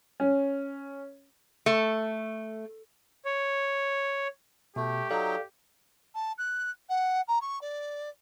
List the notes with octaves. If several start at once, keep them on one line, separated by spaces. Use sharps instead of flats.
C#4
A3
C#5
B2 A3 G4
F#3 D#4 A4 D5 F5
A5
F#6
F#5
A#5
C#6
D5